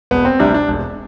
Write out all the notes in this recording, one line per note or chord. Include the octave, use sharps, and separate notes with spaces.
E1 B3
C4
D2 C3 G3 D4
D4
E1